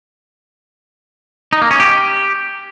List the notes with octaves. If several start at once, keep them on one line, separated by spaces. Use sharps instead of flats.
D#4
A#3
C#4
G4